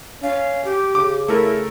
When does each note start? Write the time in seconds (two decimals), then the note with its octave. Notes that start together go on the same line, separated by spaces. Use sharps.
0.23 C#4 F5
0.65 G4
0.95 C#3 D6
1.28 A3 E4 A4 A#4